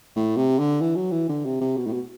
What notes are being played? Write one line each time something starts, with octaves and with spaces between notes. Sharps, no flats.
A2
C3
D3
E3
F#3
E3
D3
C3
C3
B2
A2
B2